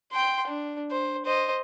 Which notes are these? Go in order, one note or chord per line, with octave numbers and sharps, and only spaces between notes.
G5 C6
D4
C5
C5 D#5